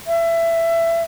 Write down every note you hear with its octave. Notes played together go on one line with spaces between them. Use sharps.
E5